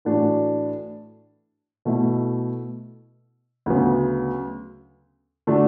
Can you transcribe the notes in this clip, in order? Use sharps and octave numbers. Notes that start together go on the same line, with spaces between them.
A2 E3 A3 D4 F#4
B2 A3 E4
D2 C#3 F#3 B3
D3 A3 D4 F#4